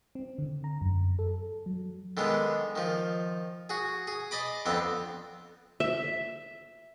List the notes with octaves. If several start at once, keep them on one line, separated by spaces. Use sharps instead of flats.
C4
D3
A#5
F#2
A4
F#3
D3 D#3 G#3 B3
D#3 F3
F#4 G#4
G#4
D5 D#5 B5 D6
F2 D3 B3 C4 D6
E5